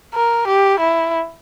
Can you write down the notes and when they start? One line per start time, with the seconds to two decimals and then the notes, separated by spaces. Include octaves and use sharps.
0.14 A#4
0.47 G4
0.80 E4